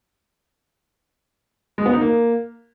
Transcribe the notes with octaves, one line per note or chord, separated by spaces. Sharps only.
G#3
B3
D#4
A#3